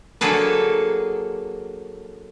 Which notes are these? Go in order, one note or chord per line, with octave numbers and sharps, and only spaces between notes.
D3 F#3 A#3 G#4 A4 B4